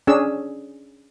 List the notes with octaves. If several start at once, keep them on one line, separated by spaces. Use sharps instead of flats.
C#4 D4 G#4 E6